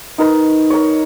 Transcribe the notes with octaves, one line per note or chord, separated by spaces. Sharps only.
D#4 A#4 B4
A#4 C#5